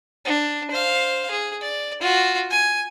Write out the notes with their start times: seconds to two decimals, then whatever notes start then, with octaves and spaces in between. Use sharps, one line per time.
0.25 D4
0.71 C5 F5
1.31 G#4
1.61 D5
2.01 F4 F#4
2.50 G#5